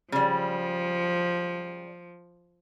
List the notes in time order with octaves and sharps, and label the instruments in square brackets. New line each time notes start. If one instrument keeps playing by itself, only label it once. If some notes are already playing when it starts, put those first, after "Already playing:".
[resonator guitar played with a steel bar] C#3 G3 [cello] F3